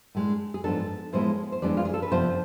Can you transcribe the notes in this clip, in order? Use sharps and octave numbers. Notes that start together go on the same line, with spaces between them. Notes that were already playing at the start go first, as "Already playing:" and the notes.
A2 G#3 D4
G#4
G#2 F3 B3 D4 A4
A2 F3 G#3 B3 E4 C5
C5
F2 E3 G#3 B3 D4 D5
F4
G#4
A4
B4
F2 C3 F3 B3 D4 C5